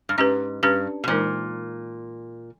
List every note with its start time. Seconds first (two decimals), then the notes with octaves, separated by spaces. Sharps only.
0.09 G2
0.18 G#2 C#4 G4 B4
0.63 G2 C#4 G4 B4
1.04 B2
1.07 A#2 E3 G#3 D#4 A#4